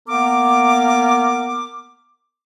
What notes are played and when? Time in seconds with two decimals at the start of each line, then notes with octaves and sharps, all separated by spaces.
0.08 A#3 B3 A#4 D6